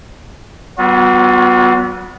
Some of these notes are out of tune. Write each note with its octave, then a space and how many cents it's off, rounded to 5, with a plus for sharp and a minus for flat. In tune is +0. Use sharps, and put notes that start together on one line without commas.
G3 -45 B3 +0 F#4 -45